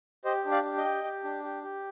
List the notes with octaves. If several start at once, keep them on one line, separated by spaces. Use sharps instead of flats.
G4 C5 D#5
D4
D5 F5
G4
D#5 G5
G4
G4
D4
G4
G4